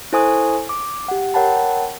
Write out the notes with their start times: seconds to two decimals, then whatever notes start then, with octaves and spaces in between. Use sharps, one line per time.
0.13 E4 A4 C5 G#5 C#6 D#6
0.69 D6
1.08 G4 F#5
1.34 A#4 C#5 F#5 G5 A5 B5